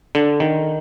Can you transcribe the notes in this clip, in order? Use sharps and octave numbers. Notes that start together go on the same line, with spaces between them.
D3
D#3